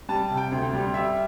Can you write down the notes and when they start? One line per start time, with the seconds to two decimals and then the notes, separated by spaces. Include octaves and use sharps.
0.09 G3 A5
0.30 C3
0.37 G5
0.51 D2
0.73 G3
0.94 G3 E5